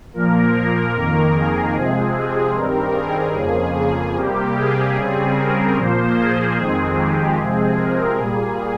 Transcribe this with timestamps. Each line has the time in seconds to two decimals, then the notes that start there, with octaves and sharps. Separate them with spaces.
0.14 A#2 F3 A#3 A#4
0.54 A#4
0.94 F2 D#3 A#3 A#4
1.34 G#4
1.75 C3 F3 G#3 C4
2.14 G#4
2.55 G2 D#3 G3 C4 A#4
2.95 G#4
3.35 F2 C#3 F3 A#3 G#4
3.75 G#4
4.15 C3 G3 A#3 G4
4.56 G#4
4.95 C#3 G3 C4 G#4
5.36 A#4
5.76 A#2 F3 A#3 C5
6.17 G#4
6.56 F2 D#3 G#3 C4
6.96 G4
7.37 C3 F3 G#3 C4 G#4
7.77 A#4
8.17 A#2 G3 A#3 G#4